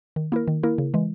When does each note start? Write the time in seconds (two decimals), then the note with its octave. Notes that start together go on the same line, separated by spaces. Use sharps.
0.16 D#3
0.32 A#3 E4 A#4
0.48 D#3
0.63 A#3 E4 A#4
0.78 C#3
0.94 E3 G#3